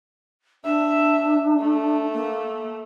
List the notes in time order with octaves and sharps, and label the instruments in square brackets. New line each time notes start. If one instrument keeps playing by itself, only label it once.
[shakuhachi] D4 [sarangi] E5
[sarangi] A3
[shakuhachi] A#3